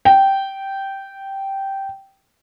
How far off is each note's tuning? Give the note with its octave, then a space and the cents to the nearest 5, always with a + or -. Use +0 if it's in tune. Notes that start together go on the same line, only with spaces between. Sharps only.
G5 -10